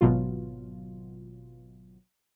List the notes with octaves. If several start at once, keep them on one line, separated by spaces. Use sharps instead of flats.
G#1 B2 F#3 F4